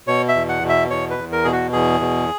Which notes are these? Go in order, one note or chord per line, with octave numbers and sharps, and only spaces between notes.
B2 C#5
E5
E2
F#5
B2
E5
E2 C#5
B4
E2
A#4
B2 G#4
F#4
E2 G#4
B2